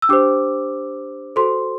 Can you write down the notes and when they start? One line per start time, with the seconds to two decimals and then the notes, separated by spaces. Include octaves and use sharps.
0.02 E6
0.09 D4 G4 C5 D6
1.36 F#4 A4 C5 C6